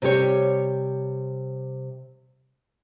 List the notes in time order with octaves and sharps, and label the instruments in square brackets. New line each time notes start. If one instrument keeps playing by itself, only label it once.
[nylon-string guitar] C3 G3 G4 C#5